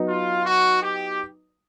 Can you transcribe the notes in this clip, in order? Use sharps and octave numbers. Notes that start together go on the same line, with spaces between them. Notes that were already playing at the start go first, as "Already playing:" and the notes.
Already playing: F#3 B3 D#4
F4
F#4
G4